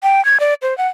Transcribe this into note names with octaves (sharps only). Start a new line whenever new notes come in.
G5
G#6
D5
C5
F#5